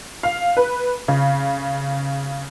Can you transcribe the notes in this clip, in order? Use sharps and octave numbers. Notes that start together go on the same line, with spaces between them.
F5
B4
C#3